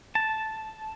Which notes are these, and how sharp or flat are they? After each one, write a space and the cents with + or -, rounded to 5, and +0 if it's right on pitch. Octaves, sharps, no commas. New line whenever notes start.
A5 -5